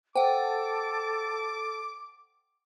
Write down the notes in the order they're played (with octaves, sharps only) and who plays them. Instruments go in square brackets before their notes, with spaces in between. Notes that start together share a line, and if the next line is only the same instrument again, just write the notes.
[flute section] A4 A5 [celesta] C5 [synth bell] F#5 G5 [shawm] D6